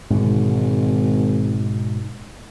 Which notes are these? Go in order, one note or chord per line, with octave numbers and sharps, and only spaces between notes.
G#1 G#2 B2 D3